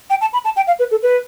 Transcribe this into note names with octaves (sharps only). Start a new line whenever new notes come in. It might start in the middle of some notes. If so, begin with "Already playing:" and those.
G5
A5
B5
A5
G5
F5
B4
A4
B4